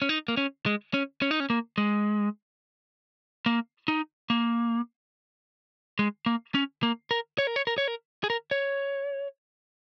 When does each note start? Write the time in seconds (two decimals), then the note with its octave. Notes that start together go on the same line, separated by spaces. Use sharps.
0.02 C#4
0.09 D#4
0.28 A#3
0.37 C#4
0.66 G#3
0.94 C#4
1.22 C#4
1.31 D#4
1.40 C#4
1.50 A#3
1.78 G#3
3.46 A#3
3.88 D#4
4.30 A#3
5.99 G#3
6.26 A#3
6.55 C#4
6.83 A#3
7.11 A#4
7.38 C#5
7.47 A#4
7.56 C#5
7.67 A#4
7.78 C#5
7.88 A#4
8.24 G#4
8.30 A#4
8.51 C#5